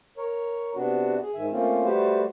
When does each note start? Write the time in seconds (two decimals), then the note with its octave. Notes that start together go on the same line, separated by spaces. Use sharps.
0.17 A#4 C#5
0.75 C3 B3 D4 F#4
1.22 G#4
1.35 G#2 D#3 E5 G#5
1.51 A3 A#3 C4 C#4 F4
1.85 G3 A3 F#4 G4 B4 C5